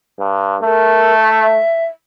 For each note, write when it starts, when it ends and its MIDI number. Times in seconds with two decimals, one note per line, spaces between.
0.19 0.56 43
0.63 1.58 57
0.63 1.17 70
1.19 1.85 76